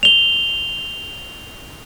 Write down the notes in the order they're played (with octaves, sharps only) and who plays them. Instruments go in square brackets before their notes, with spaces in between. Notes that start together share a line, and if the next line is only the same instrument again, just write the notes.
[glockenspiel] F7 G7